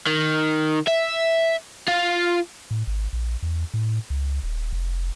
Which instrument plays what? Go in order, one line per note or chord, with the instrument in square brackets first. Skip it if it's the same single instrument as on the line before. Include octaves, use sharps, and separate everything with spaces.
[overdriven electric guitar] D#3
E5
F4
[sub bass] A2
G#1
A#1
E2
A2
C#2
D#1
F1